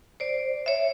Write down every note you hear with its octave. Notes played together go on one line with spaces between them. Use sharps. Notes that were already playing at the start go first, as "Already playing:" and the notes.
C5 D5
C#5 E5